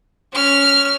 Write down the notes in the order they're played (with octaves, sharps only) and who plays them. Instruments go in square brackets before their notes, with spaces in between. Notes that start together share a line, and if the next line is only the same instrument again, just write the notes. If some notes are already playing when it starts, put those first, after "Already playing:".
[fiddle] C#4 F6